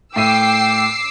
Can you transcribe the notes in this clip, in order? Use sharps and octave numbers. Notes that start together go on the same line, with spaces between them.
A2 E5 G5 D6 E6 C7 D#7